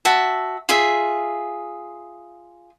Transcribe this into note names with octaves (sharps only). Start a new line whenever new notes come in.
F#4 E5 A5
F4 G#4 E5